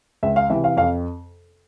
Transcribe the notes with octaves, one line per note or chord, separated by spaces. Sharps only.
C#2 E5
F5
C3 E3 E5
F5
F2 F5